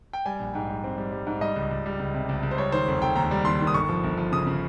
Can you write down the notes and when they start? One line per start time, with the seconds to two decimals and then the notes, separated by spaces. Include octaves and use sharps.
0.13 G5
0.26 G3 G#5
0.40 A#1
0.54 G#2 G5
0.69 G3
0.84 C4
0.98 G3
1.12 G3
1.27 G#2
1.41 G3 D#5
1.56 C#2
1.71 C#2
1.86 G3
1.99 C#2
2.14 C3
2.29 C#2
2.43 C#2
2.51 C5
2.58 G3 C#5
2.72 D#3 C5
2.88 F1
3.02 F1 G5
3.16 D#2 A#5
3.31 G3
3.45 D#2 C6
3.60 D#3
3.67 D#6
3.74 G1 C#6
3.89 F3
4.04 G1
4.17 F3
4.32 C#3 D#6
4.47 C#3